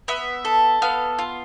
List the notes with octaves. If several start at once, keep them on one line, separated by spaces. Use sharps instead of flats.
B3 E5
A4
B3 F5
F4